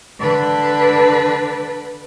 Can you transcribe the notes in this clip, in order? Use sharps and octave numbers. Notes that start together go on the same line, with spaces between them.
D3 B4